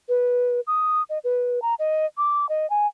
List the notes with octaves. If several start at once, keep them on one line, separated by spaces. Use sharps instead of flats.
B4
D#6
D#5
B4
A#5
D#5
D6
D#5
G#5